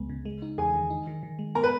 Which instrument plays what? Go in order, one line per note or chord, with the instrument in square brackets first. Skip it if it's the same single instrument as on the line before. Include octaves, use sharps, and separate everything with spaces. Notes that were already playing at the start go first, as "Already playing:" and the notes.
Already playing: [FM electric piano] C#2 G#3 B3
C#3
G#3
D#4
[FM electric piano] E2 [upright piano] G#4 G#5
[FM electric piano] D#3
D#4
D#3
D#3
G#3
[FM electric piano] B3 [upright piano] A#4 A#5
[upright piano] B4 B5